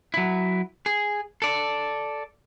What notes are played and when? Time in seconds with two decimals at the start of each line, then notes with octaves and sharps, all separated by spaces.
0.14 F#3 E4
0.86 G#4
1.42 A4 D5